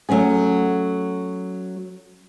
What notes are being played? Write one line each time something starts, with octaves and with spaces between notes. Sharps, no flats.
F#3 A3 C#4 G#4